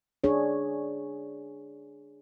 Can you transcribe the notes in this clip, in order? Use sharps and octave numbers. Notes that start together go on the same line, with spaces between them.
D4 G#4 C#5